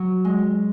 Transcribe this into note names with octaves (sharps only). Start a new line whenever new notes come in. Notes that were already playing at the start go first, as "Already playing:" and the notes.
Already playing: F#3
G#3